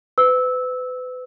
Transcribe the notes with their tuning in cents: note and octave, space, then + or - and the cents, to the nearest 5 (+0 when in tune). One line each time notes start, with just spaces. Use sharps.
B4 +35 E6 -15